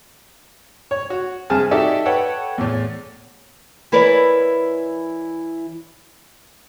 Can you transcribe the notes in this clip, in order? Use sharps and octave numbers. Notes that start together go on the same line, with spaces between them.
C#5
F#4
G2 C3 G#4 G#5 A5 F6
D#4 F#4 G4 A4 D5 E5
A4 B4 C#5 F#5 G5
E2 A2
E3 E4 A#4 B4 C#5 D5